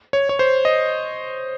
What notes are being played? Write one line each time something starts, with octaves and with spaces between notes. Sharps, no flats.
C#5
C#5
C5
D#5